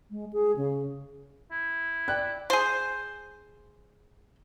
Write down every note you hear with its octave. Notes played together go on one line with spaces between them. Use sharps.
G#3
G#4
C#3
E4
D5 G5 F#6
G#4 C5